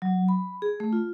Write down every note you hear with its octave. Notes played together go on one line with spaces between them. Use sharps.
F#3
B5
G#4
A3
F4